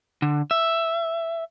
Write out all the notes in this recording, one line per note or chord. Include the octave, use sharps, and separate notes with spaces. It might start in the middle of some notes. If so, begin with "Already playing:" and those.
D3
E5